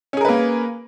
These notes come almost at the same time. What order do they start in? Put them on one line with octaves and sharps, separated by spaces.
C#4 G#4 A#4 B4 A#3